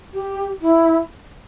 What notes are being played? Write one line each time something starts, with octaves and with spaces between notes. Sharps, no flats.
G4
E4